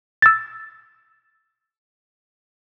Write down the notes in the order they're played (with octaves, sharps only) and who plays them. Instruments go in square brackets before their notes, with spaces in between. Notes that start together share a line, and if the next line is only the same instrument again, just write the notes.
[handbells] E6 A6